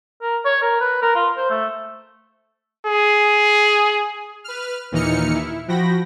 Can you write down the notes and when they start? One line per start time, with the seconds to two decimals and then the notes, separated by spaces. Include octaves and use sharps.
0.22 A#4
0.45 C#5
0.62 A#4
0.81 B4
1.02 A#4
1.15 F4
1.37 C5
1.50 A3
2.86 G#4
4.44 B4 F6
4.92 D#2 A#2 E3 D#4 F6 C#7
5.34 E4
5.68 F3 F#4 G5 B5 A#6